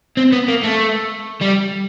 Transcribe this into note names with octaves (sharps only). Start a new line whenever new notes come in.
C4
B3
A#3
A3
G3